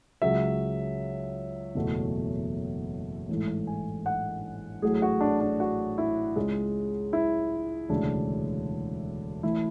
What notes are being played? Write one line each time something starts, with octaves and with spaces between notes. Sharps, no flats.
C#2 C#3 F#3 E5
F#1 E2 B2 F#3 A3
A1 G#2 E3 A3
G#5
F#5
A1 A2 F#3 A3 G#4
F#4
D4
D4
F#4
E4
C#2 C#3 G#3
E4
E1 D2 C#3 E3 D4
A1 A2 E3 E4